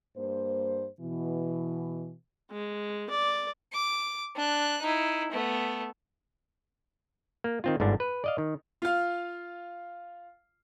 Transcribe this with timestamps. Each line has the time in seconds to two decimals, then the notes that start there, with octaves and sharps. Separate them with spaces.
0.16 G2 A#3 C5
0.99 B2 E3
2.51 G#3
3.10 D5
3.72 D6
4.36 D4 F#6
4.81 D#4 E4
5.32 A3 B3
7.44 A#3
7.64 D#3 C4 F4
7.80 G1 G#2 D3 D4
8.00 B4
8.24 D5 D#5 F5
8.38 D#3
8.82 F4 F5